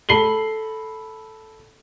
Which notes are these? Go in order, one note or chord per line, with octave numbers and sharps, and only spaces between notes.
A4 B5 C7 F#7 G7